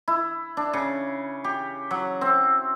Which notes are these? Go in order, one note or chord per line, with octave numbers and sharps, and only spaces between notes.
E4
D4
C#3
G4
F#3
C4